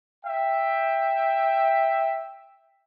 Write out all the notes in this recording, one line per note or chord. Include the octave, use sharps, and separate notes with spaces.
E5 G5